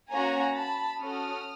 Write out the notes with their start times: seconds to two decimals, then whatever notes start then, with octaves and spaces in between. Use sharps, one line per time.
0.11 A#3 C#4 F#4 G#5 A#5
0.56 A5 B5
1.01 C#4 F#4 A4 D#6 F6